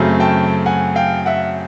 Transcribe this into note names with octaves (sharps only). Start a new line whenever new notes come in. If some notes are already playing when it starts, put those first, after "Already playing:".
Already playing: F#2 C#3 F#3 A3 C4
G5 A5
F#5 G#5
F5 G5
E5 F#5